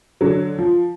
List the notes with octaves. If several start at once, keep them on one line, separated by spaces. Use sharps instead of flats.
D3 F#3
F3